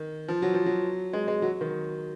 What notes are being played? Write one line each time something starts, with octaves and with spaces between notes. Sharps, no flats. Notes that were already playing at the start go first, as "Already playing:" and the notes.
Already playing: D#3
F3
F#3
F3
F#3
G#3
G#3
F#3
D#3